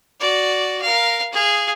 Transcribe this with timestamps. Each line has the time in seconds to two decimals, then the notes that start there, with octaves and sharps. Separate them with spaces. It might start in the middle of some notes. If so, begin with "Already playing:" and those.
0.20 F#4 D5
0.82 A#4 F5
1.33 G#4 F5